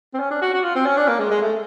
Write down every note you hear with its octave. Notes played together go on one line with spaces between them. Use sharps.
C4
C#4
D4
F#4
F#4
F4
C4
C#4
D4
A#3
G#3
G#3
A3